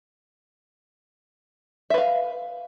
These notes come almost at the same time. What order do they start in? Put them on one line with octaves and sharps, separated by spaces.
E5 B4 F5